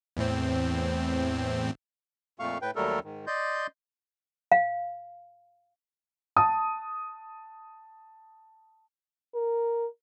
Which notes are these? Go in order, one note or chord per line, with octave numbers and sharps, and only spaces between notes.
E2 A2 C4
F2 A#2 A3 F5 C#6
A2 B4 G5
D#2 F#3 G3 A3 A4 A#4
G#2 D#3
D5 D#5 C6 G6
F5
A5 D#6
A#4